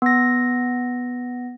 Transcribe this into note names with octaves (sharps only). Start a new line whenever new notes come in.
B3 A#6